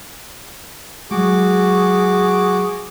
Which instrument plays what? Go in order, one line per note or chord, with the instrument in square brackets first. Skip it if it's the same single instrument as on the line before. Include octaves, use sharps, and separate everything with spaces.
[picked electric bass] F#3 G#3 [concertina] F#4 D6 [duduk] G#4